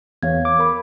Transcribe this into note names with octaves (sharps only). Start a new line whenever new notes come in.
E2 C#5 F5 G#6
D6
A#4 B5